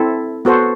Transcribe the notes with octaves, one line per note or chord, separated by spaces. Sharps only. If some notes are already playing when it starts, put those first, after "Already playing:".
Already playing: C4 E4 A4
B3 F#4 A4 C5